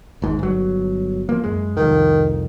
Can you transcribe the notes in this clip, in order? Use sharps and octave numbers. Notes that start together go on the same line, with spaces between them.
G#1 G#2
G1 F#3
F3 A#3
F#2 G#3
C2 F2 D#3